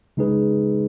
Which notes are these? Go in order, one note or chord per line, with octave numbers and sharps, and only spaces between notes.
C#3 G#3 D#4 G#4 B4